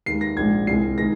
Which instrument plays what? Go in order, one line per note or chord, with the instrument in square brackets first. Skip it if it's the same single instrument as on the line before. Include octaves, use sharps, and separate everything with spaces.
[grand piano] D#2 D#3 G#3 C7
A#6
A#1 G#2 G#3 G#6
C2 C3 G#3 C7
D#3 G#3 A#6